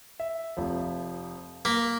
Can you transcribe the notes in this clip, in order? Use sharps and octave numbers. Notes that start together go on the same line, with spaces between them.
E5
F1 F3
A#3 B6